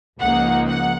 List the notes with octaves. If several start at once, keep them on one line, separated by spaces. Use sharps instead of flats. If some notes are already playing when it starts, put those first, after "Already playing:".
C#2 C#3 F3 A#3 D#4 F#5
F#5